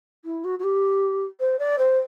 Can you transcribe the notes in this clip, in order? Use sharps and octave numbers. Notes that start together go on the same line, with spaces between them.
E4
F#4
F#4
G4
C5
D5
C5